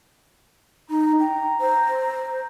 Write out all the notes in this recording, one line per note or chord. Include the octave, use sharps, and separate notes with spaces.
D#4 A#5
G5
C5